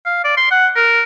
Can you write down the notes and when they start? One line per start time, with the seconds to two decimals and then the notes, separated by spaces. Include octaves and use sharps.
0.05 F5
0.24 D5
0.37 C6
0.51 F#5
0.76 A#4